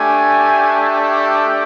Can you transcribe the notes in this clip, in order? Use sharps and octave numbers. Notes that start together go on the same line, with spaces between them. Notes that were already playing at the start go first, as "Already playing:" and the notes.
Already playing: A3 D4 G4 G#5